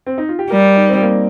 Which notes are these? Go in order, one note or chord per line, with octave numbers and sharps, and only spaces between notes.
C4
D#4
F4
G4
G3 A#4
D#4
C4
A#3